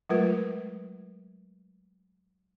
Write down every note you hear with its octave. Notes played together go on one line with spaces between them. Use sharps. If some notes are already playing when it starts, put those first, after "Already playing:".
F#3 G#3 A3 F4 A#4 B4